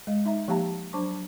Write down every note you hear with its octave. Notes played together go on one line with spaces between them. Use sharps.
G#3 D#5 F5
D#4 E5 A#5
F3 A#3 G4 F5 A5 A#5
F#3 D4 C5 A5 C#6 D6